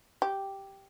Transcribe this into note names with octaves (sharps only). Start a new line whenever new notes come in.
G4